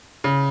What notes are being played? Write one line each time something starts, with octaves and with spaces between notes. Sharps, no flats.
C#3